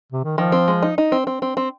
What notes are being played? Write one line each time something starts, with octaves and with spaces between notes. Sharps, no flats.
C3
D#3
D#3 F3
C4
G#3
D#4
D#4
C4
C4
C4
C4